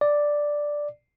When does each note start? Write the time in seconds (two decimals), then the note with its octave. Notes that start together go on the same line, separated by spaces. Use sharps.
0.01 D5